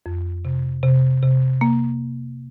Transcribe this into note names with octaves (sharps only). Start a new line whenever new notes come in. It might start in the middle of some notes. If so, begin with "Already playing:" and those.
F2
C3
C3
C3
A#3